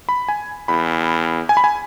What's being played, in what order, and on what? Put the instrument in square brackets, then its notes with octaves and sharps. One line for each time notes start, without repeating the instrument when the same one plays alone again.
[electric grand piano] B5
G#5
[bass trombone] E2 [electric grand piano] B5
[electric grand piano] G#5
B5
G#5